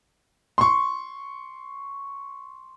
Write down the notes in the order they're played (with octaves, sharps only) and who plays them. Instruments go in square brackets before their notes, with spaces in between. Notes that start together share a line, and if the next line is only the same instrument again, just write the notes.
[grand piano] C6 C#6